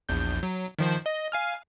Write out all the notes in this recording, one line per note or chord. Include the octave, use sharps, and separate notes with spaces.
A#1 E2 G6
F#3
D#3 F3 C5
D#5
F5 G#5 F6